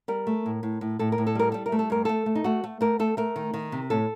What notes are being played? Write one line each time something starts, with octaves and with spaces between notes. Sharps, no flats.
G3 A#4
A3
A2
A2
A2
A2 A4
A#4
A2
A4
G3 A#4
G3 A4
A#4
A3
A4
G2 A#4
A3 A4
A3
D#4
A3 F#4
A3
A3 A#4
A3 A4
A3 A#4
D#3
D#3
C3
A2 A4